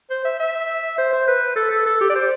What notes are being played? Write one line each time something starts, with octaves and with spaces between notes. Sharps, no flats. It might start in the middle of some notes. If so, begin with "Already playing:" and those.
C5
E5
E5
C5
C5
B4
A4
A4
A4
G4
D5
C5